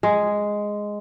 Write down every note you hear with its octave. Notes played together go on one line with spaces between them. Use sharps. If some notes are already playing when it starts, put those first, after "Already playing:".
G#3